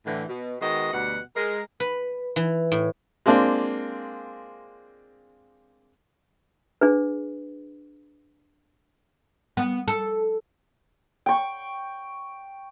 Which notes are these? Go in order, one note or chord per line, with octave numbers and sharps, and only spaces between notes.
A2 D3 E3
B2
D#3 G#3 B3 F#4 D#5
D2 B2 G3 F#5
G#3 A#4
B4
E3
A2
G#3 A#3 C4 D4 F4
D4 G#4 B4
B3
A4
G5 C#6